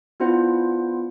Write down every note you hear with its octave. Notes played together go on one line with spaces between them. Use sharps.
B3 D4 E4 F4 C5 F#5